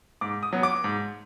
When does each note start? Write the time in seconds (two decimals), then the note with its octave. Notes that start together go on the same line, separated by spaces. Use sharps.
0.21 G#2 D6
0.43 D#6
0.53 F#3 B3
0.63 D6
0.84 G#2